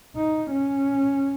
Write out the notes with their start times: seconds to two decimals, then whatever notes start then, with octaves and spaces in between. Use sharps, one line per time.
0.16 D#4
0.50 C#4